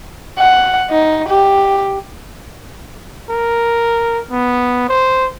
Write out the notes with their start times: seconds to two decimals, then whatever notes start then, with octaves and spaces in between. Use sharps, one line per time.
0.38 F#5
0.90 D#4
1.28 G4
3.29 A#4
4.31 B3
4.88 C5